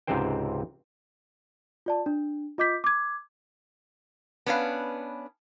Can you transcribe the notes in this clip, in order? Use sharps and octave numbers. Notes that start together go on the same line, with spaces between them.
C#2 G#2 C3 C4 C5 G5
F4 D5 A5
D4
F4 D#5 D6 G6 B6
D6 G#6
B3 C#4 D4 B4 F5